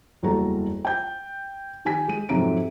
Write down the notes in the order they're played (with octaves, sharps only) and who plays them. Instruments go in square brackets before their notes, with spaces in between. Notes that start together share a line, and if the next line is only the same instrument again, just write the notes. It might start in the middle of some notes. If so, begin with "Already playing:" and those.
[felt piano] F#1 E2 G3 F#4 A4 A#5
G5 G6
D#3 G4 G#5 B6
G#3 D#7
F2 G#2 C3 F#3 A#5 D7